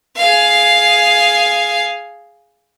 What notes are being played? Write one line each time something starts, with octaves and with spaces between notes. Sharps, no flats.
G#4 F5